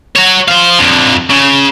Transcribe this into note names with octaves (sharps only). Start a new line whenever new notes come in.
F#4 C#5
C5 F5
F2 D3
C#3